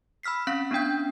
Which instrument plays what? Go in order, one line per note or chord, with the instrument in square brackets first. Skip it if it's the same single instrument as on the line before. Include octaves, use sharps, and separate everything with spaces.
[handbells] B5 E6 F6 B6 C7
C4 C#4 F5 B6
B3 C#4 D4 G5 G6